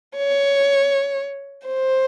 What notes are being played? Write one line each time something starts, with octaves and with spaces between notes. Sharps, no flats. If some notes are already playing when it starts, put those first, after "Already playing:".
C#5
C5